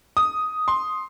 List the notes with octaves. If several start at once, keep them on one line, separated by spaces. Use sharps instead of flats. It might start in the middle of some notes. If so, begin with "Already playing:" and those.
D#6
C6